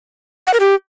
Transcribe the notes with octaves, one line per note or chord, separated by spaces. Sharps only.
F#5
A#4
G4